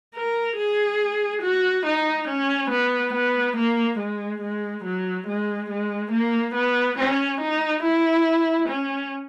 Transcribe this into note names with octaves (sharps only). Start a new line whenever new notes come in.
A#4
G#4
F#4
D#4
C#4
B3
B3
A#3
G#3
G#3
F#3
G#3
G#3
A#3
B3
C#4
D#4
E4
C#4